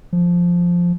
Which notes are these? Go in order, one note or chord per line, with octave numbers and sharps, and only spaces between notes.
F3